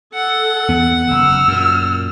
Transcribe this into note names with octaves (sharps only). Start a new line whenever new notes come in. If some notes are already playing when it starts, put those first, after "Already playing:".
A4 F#5
E2 B3
F#1 E6 F6
F#2 A#2